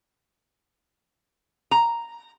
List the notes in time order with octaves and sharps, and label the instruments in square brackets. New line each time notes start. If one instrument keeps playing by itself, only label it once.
[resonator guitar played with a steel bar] A#5